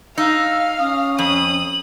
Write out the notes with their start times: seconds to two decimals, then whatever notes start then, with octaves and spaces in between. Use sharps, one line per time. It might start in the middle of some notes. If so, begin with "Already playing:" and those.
0.18 D#4 F5 E6
0.79 C#4 D#6
1.18 F2 D#6 F#7